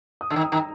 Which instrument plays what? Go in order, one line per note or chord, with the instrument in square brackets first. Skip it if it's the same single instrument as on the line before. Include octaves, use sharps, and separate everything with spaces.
[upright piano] D#6
[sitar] D3 [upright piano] E6
[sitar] D#3
[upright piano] D#6
[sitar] D#3 [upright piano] A#5